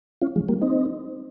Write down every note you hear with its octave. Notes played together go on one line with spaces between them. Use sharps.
C#4 F4
F3 G#3
G3 A#3
C4 D#4